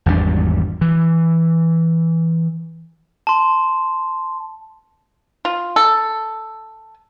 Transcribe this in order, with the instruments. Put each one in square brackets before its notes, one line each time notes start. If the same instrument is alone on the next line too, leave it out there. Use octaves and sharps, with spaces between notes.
[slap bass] G#1 E2 G3 D4
E3
[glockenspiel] A5 C6
[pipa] F4
A4